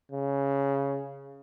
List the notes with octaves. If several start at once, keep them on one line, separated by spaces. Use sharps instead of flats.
C#3